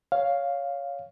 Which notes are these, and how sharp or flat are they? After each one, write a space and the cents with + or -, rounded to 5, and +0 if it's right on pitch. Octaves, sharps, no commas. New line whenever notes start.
C#5 +10 F5 +0